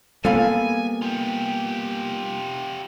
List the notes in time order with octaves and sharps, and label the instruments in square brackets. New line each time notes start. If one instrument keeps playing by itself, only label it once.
[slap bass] G3 A#3 B3 [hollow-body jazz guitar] A4 F5 B5 [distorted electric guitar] G#5
[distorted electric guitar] F4 G4